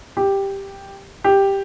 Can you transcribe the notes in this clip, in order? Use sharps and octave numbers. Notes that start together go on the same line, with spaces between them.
G4
G4